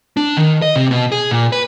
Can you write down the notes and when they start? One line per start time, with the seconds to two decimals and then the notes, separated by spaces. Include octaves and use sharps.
0.17 D4
0.37 D#3
0.62 D#5
0.76 C3
0.91 B2
1.12 G#4
1.31 A#2
1.52 B4